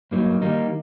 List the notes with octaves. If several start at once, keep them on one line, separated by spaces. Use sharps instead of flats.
G2 F#3 A#3 D#4
D#3 G3 A#3 D#4